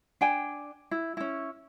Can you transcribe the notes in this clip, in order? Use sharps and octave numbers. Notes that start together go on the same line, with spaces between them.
D4 G5 G#5
E4
C#4 E4